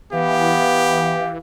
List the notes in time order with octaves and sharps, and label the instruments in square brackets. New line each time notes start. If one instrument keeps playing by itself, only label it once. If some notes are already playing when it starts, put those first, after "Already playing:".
[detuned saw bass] E3 [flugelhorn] B3 [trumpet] G4 [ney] F5